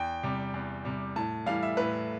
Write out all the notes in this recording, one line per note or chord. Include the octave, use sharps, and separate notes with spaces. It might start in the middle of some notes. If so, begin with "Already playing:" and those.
Already playing: E2 G5
C3 G3
E2
C3 G3
A2 A5
E3 G3 F5
E5
A2 B4